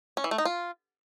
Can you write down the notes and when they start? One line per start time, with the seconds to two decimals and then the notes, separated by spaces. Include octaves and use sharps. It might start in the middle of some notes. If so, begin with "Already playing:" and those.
0.17 C#4
0.24 E3
0.31 A3
0.38 D#4
0.45 F4